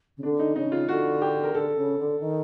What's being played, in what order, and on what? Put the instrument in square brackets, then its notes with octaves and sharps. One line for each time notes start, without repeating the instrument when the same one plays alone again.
[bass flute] C#3
[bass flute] D3 [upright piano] D4
[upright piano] D#4
[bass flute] C#3 [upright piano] D#4
[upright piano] F4
[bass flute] D3 [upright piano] F#4
[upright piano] G4
A#4
[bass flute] D3 [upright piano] A4
[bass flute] C#3
D3
D#3